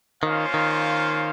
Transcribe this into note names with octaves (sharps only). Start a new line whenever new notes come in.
D#3 A#3 C#4 F4 C5 F5
D#3